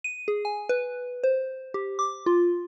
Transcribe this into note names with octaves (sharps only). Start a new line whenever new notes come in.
D#7
G#4
G#5
B4
C5
G4
D6
F4